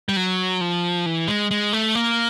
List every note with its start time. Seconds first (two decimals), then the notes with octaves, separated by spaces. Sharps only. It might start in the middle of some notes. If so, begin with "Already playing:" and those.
0.09 G3
0.16 F#3
0.61 F3
1.06 E3
1.28 G#3
1.51 G#3
1.73 A3
1.95 A#3